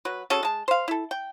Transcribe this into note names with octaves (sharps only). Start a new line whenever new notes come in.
F#3 F#4 B4
C#4 F#4 G#4 A4
G#3 A5
C5 F5
E4 A4
G5